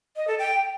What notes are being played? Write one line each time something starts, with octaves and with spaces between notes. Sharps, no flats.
D#5
A4
G5